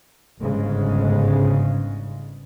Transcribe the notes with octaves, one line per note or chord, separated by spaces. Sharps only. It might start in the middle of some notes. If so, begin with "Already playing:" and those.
G1 G#2 C#3 G#3